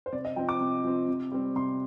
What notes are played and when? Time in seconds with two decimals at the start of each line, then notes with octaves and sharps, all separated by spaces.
0.06 C5
0.12 C3 D5
0.25 D#5
0.36 F3 C4 G5
0.49 D6
0.60 C3
0.84 F3 C4
1.08 C3
1.32 G3 C4
1.56 C3 C6